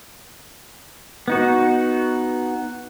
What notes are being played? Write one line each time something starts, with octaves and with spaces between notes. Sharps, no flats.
B3 D#4 F#4